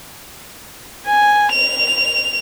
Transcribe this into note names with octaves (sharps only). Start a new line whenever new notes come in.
G#5
F7